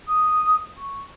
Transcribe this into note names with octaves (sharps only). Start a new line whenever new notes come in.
D#6
C#6